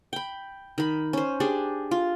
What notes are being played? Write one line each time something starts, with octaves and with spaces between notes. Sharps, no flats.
G5 B5
D#3 B5
C#4 C5
D4 G4 G#4
F4